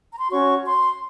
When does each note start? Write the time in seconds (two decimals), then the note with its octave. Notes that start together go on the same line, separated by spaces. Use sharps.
0.12 A#5
0.21 C6
0.30 C#4 F#4 C#5 C#6
0.66 C6